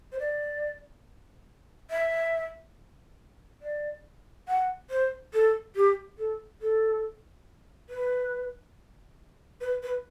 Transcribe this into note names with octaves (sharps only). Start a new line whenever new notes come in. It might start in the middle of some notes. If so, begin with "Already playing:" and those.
C5
D5
E5
D5
F#5
C5
A4
G4
A4
A4
B4
B4
B4